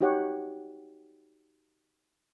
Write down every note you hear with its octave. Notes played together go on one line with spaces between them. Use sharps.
D#4 F#4 G4 C#5 F#5